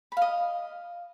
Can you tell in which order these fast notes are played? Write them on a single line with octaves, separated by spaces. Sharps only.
B5 F5 D#5